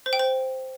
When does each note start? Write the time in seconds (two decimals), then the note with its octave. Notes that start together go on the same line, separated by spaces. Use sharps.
0.06 C5
0.13 G5
0.19 C5